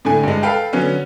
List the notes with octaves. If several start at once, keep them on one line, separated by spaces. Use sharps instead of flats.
A2 D3 G#5
G2 G#3
A4 B4 F5 G5
D3 F#3 B3 C#4